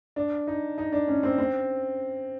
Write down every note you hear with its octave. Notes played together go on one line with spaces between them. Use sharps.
D4
D#4
D#4
D4
C#4
C4
C4